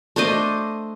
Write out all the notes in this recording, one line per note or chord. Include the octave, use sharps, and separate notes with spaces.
A3 D4 C5 D#5